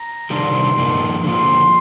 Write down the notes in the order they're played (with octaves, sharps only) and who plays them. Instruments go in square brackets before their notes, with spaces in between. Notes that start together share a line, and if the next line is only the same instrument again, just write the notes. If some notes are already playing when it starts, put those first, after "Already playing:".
Already playing: [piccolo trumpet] A#5
[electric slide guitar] C3 D#3 G3 D4 G4 [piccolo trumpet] C6
[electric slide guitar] G2 F3 A#3 D#4
[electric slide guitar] D3 F3 A#3 F4 [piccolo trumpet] C6